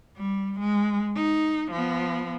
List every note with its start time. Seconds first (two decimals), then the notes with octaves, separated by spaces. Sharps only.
0.17 G3
0.60 G#3
1.16 D#4
1.71 F3 B3